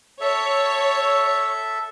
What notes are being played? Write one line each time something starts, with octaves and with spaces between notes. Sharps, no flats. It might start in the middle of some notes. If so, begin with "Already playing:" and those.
A4 C#5 E5